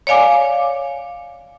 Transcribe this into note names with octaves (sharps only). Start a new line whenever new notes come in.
C#5 D5 F5 G#5 D6